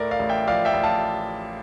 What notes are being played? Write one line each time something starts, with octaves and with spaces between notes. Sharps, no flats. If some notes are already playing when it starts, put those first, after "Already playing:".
Already playing: A2 A3 A#4 D5
D5 F5
A1
E5 G5
F3 D5 F5
E5 G5
A1
F5 A5